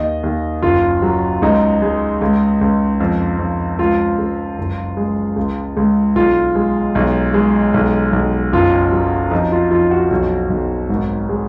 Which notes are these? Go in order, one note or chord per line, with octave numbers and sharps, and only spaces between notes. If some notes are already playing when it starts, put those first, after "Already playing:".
Already playing: D#2 D#5
D#2
F#1 F4
F#3
C#2 D#4
G#3
C#2
C#2
F2
F2
C#2 F4
C#2
F#1
G#3
C#2
C#2
B1 F4
G#3
B1
G#3
B1
B1
F#1 F4
F#3
F2 D#4
F4
F2 F4
F#4
B1 F#4
B1
G#1
G#3